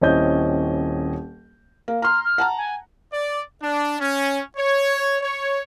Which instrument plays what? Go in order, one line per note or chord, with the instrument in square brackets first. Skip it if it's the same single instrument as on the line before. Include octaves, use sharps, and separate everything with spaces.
[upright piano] D#1 C4 C#4 E4 D#5 G6
[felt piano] A#3
[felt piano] A#5 C6 [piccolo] F6
[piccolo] F6
[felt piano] F#5 A5 A#5
[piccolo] G#5
[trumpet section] D5
D4
C#4
C#5
C#5